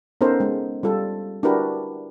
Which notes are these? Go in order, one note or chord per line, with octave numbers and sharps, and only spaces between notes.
B3 C#4 D#4 A4 A#4 C5
G#3
G3 F4 A4
D4 E4 F#4 G4 A#4 B4